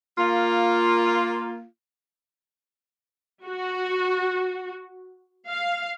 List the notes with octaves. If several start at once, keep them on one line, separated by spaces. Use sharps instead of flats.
A#3 F4
F#4
F5